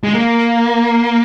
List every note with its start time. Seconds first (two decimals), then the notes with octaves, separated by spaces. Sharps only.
0.04 G#3
0.14 A#3